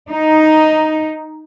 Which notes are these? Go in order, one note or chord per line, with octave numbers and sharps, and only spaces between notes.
D#4